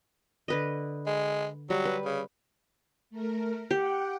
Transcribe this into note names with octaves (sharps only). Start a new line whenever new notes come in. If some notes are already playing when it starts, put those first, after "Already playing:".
D3 B4 D#5
G#3
F#3 G3
B4
C#3
A3 A#4
G4 F#5 G5